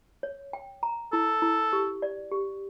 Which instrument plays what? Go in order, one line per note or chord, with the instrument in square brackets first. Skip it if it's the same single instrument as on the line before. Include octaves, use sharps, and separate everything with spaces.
[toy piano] C#5
G5
A#5
[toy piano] E4 [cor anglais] A4
[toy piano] E4
G4
D5
G4